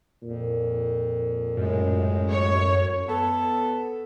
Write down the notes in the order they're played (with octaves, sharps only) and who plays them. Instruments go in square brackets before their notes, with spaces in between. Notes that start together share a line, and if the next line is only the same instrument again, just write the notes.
[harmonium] F2 [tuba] A#2
[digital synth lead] F#2 [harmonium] A2 G#3
[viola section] C#5
[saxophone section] B3 A4